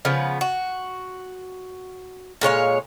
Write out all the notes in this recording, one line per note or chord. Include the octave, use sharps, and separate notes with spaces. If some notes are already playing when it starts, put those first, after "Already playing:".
C#3 F3 B3
F#4
A#2 G#3 C#5 F5